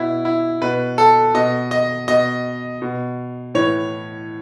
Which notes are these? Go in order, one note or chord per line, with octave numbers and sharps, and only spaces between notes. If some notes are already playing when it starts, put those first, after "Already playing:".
Already playing: B2 E4
E4
B2 B4
A4
B2 D#5
D#5
B2 D#5
B2
A2 E3 C#5